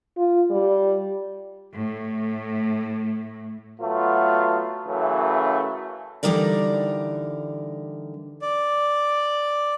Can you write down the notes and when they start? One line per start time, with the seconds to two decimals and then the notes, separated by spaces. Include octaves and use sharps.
0.17 F4
0.50 G3
1.74 A2 A3
3.81 F#3 A3 B3 F4
4.87 F#2 C#3 E3 F#3 A3
6.23 D3 E3 G3 D#4 A#4 D5
8.42 D5